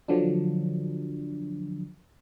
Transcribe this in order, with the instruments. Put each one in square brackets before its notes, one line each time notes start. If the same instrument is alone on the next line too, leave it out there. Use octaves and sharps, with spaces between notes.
[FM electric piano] D3 F3 F#3 D4